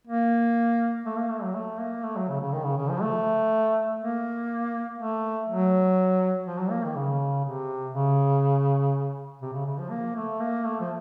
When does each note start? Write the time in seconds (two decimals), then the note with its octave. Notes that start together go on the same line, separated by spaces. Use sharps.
0.07 A#3
1.06 A3
1.17 A#3
1.30 A3
1.42 F#3
1.54 A3
1.79 A#3
2.03 A3
2.16 F#3
2.29 C#3
2.40 C#3
2.52 D#3
2.64 C#3
2.77 C#3
2.90 F3
3.02 A3
4.00 A#3
4.98 A3
5.48 F#3
6.46 F3
6.59 F#3
6.70 A#3
6.84 D#3
6.96 C#3
7.44 C3
7.94 C#3
9.42 C3
9.53 C#3
9.66 C#3
9.78 F3
9.91 A#3
10.16 A3
10.40 A#3
10.65 A3
10.80 F3